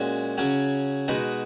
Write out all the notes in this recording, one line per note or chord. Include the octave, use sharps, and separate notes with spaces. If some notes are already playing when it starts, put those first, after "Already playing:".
Already playing: A#2 G#3 C#4 F#4
C#3 F#3 C#4
B2 G#3 D#4 F#4 B4